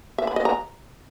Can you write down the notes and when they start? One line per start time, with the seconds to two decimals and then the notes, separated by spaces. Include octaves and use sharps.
0.18 E5
0.27 B5
0.36 D#5
0.45 A#5